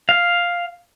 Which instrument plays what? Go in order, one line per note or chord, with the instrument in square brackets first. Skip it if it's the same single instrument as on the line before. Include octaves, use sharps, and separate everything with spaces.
[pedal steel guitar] F5